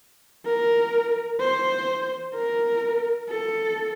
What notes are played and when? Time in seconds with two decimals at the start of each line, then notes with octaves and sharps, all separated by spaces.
0.45 A#4
1.40 C5
2.35 A#4
3.29 A4